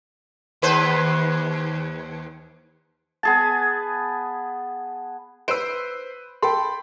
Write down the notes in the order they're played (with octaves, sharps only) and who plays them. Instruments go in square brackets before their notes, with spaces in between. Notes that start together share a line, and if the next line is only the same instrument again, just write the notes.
[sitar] D#2 B4 C5
[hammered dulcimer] B3 G#4 A5
[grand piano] B4 D7 [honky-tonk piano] C5 E6
[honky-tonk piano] A4 [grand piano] G5 B5 [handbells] C6